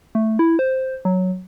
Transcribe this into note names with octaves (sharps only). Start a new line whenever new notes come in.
A3
E4
C5
F#3